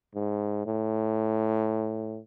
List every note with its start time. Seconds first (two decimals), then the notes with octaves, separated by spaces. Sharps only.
0.15 G#2
0.66 A2